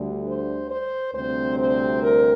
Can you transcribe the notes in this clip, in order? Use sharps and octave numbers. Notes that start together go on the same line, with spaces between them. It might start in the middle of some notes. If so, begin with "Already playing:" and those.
Already playing: D2 D3 G3
C5
C5
D2 C3 G3 C4 C5
C5
A#4